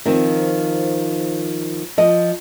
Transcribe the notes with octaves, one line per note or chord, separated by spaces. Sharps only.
D#3 F3 C4
F3 D#5